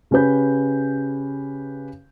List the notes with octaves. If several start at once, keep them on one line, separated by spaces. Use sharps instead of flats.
C#3 C#4 G4 B4 G6